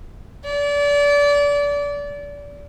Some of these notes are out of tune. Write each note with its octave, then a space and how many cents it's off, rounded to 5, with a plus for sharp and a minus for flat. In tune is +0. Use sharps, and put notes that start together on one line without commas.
D5 -30